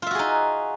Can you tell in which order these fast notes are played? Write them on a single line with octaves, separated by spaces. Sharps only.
F4 E5 F#4 G#4 D#4